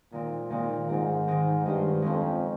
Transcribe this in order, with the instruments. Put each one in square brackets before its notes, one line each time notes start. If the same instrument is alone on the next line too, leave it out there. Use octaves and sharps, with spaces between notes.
[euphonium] A#2 [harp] D#3 G#3 C4
[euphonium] A#2 [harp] D#3 G#3 C4
[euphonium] G#2 [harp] D#3 G#3 C4
[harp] D#3 G#3 C4
[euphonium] G2 [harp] G#3 C#4 F4 C5
[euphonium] F2 [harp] G#3 C#4 F4 C5